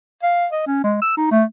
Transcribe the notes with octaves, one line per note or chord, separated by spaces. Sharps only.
F5
D#5
C#4
G#3
E6
D#4
A3